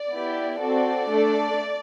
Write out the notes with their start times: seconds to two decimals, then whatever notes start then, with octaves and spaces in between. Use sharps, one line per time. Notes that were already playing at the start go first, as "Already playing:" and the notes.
Already playing: D5
0.12 B3 E4 G4
0.59 C4 F#4 A4 D5
1.08 A3 D4 A4